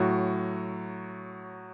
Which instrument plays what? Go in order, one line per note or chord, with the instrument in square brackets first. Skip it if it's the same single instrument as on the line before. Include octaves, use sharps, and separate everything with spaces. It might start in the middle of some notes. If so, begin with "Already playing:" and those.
Already playing: [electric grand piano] A2 F#3 F#4